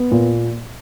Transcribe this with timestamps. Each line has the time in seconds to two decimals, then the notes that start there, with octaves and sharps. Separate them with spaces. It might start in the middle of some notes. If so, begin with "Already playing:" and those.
Already playing: B3
0.11 A#2